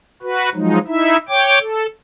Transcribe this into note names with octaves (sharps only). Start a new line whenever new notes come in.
F#4 B4
F3 F#3 G#3 D#4
D#4 E4 E5
C#5 G5 D6
A4